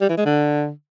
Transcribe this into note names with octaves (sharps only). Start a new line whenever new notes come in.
G3
E3
G#3
D3